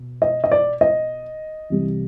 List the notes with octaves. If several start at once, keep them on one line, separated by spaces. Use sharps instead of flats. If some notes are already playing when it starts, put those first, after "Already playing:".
Already playing: B2
D#5
D#5
D5
D#5
C2 C3 E3